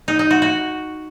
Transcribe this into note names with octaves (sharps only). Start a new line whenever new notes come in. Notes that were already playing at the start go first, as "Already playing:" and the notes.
D#4
D#4
F#4
F#4